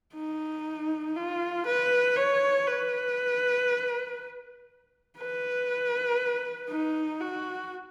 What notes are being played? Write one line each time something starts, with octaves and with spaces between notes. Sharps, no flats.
D#4
F4
B4
C#5
B4
B4
D#4
F#4